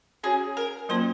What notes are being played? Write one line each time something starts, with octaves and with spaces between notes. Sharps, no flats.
C#4 F#4 G#4 C#5
A#4
F#3 A#3 C#4 F4 C5